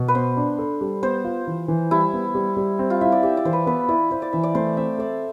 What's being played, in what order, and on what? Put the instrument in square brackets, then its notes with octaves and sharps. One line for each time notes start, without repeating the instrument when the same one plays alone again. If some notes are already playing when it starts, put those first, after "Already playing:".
Already playing: [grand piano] B2
[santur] B4
[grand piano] B3 [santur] C5
[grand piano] D4
A4
G3
[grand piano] B3 [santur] C5
[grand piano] F4
E3
E3
[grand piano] G3 [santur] E4
[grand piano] B3
G3
G3
C4
[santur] F4
[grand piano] E4 [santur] E5
[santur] D5
[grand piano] G4 [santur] E5
[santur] D5
[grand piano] E3 [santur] C5
[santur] B4
[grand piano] B3 [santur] B4
[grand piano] E4 [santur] D5
[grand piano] E4 [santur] C5
[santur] D5
[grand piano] E3 [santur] E5
[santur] D5
[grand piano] A3 [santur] C5
[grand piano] C4 [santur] E5
[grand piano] A4 [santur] D5